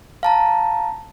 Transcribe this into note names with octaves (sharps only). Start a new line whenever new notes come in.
F5 A5 A#5